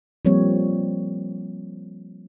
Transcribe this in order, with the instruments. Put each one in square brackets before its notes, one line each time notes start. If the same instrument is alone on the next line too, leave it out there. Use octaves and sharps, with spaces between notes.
[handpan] F3 G3 A#3 C4 C#5